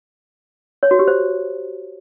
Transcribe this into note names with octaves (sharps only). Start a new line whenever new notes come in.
C#5
F#4
G4
C5